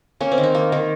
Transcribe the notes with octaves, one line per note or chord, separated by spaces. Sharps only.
A#3 C#4
C4
D#3
D#4
A#3
D#3